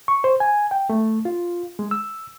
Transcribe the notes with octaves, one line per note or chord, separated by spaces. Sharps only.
C#6
C5
G#5
G5
A3
F4
G#3
E6